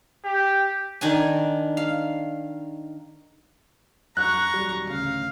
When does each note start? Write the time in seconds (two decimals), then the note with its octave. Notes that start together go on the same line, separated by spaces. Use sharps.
0.25 G4
1.01 D#3 D4 G#5
1.77 F5
4.17 F#2 A#5 C#6 F#6
4.53 D#1 F#3 G3
4.90 A1 D2 C#3 F5